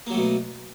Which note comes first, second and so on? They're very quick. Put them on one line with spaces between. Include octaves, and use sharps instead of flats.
A#3 F#3 A3 B2